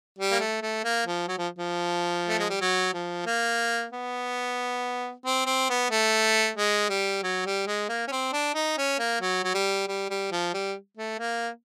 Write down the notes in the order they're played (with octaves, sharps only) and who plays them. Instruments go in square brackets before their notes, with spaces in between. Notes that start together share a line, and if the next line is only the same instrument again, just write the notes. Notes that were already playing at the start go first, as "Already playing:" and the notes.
[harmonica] G3
A#3
A3
A3
A#3
F3
F#3
F3
F3
A3
G#3
G3
F#3
F3
A#3
B3
C4
C4
B3
A3
G#3
G3
F#3
G3
G#3
A#3
C#4
C4
D4
D#4
C#4
A#3
F#3
F#3
G3
G3
G3
F3
G3
A3
A#3